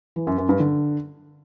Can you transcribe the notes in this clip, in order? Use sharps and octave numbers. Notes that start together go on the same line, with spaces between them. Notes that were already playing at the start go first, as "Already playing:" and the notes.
E3
F#2
F#2
G2
D3